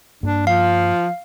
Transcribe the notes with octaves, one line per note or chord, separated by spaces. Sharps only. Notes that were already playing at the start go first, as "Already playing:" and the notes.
G2 A#3 D4
F3 F5